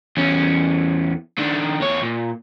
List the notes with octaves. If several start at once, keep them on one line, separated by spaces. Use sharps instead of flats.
E2 C#4
D#3 D4
E2 C#5
A#2